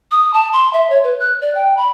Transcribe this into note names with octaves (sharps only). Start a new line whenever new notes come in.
D#6
A5
C6
E5
C#5
B4
F#6
D5
G5
B5